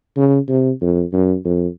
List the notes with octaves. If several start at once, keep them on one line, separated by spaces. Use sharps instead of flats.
C#3
C3
F2
F#2
F2